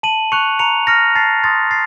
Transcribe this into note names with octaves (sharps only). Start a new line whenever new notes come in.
A5 D#7 F#7
C#6 F#6 C#7 F7
A#5 C#7 F7
F6 A#6 C#7
A5 A6 C7
C6 D#6 A6
A6 C7